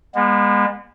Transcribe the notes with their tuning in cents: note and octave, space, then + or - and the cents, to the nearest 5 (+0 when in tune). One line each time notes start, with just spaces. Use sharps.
G#3 -35 B3 -35